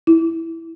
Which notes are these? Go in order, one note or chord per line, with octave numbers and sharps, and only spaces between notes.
E4